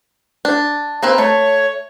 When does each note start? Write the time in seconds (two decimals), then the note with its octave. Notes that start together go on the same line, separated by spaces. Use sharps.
0.45 D4
1.03 A#3 C4 B4
1.18 A3 C#5